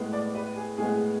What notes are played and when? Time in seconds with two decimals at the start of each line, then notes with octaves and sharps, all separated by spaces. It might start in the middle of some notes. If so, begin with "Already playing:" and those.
Already playing: A2 G#3 B3
0.13 D5
0.35 B4
0.56 G#4
0.78 A2 G#3 B3 G#4